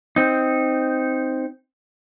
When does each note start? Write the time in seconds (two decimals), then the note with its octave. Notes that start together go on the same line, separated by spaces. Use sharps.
0.16 C4 D#4